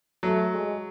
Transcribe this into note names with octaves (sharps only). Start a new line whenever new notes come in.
F#3 A3
G#3